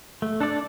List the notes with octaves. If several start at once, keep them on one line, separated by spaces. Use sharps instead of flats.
A3
D4 A4 D5